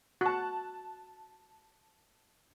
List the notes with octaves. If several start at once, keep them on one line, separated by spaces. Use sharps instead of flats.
F#4 A5 F#6